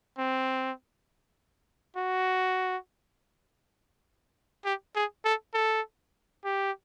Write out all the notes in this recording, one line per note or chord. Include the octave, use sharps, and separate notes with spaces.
C4
F#4
G4
G#4
A4
A4
G4